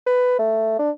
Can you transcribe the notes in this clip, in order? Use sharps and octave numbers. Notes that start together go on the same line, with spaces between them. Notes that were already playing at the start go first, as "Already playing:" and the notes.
B4
A3
D4